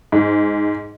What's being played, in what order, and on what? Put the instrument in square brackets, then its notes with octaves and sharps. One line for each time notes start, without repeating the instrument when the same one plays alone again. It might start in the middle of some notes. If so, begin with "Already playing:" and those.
[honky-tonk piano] G#2